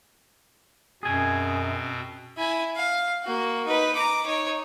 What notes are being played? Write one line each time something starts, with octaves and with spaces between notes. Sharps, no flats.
F#2 B2 C4 G#4 G#5
E4 G#5
F5
A#3 F#4
D#4 B4
A#5 D6
D#4 C#5